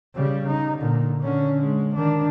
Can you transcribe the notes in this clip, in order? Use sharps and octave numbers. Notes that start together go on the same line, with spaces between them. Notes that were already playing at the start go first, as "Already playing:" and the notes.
C#3 G3
D#4
A#2 D3
D3 C#4
G#3
D#3 D4